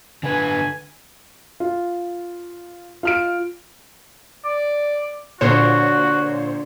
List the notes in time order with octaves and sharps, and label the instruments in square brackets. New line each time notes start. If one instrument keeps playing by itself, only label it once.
[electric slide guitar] D3 B4 [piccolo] G#5
[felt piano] F4
F4 F6 D7
[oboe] D5
[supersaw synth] A#2 C5 C#5 [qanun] D3 A4 [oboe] F#4